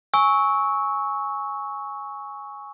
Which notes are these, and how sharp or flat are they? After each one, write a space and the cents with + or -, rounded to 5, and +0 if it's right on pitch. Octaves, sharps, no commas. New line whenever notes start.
G#5 +0 C#6 +0 E6 -25